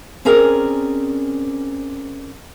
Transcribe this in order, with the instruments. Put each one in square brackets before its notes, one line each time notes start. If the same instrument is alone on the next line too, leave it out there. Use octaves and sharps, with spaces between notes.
[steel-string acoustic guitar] C4 C#4 G#4 A#4 D5 G#5